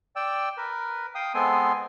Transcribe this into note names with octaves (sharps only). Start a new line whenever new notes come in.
D5 G5 E6
A#4 B4
F5 G5 D#6
G#3 B3 C4 A4 G#5 C6